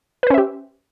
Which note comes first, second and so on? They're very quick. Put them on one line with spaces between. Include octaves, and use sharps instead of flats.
B4 C5 C#4 E5 G4